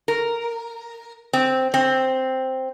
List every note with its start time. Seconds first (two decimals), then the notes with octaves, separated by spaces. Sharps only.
0.08 A#4
1.33 C4
1.74 C4